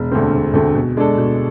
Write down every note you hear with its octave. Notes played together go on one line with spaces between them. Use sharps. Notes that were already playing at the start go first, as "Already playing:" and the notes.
Already playing: E1
D2 D3 A3 C4
E1
D2 D3 A3 C4
B2
G#3 D4 A4
B2